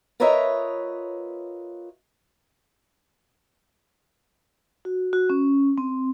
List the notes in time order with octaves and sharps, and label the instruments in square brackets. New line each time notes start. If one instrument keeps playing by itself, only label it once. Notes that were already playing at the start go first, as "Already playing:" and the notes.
[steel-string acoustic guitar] F4 A#4 B4 C#5 D#5 E5
[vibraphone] F#4
F#4
C#4
C4